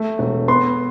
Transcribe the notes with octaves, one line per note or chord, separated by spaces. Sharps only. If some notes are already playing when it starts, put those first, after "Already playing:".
Already playing: A3
E1
B3 C6